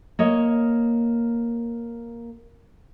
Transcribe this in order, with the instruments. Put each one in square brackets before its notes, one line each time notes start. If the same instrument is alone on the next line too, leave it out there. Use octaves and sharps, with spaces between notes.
[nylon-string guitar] A#3 C#5 D#5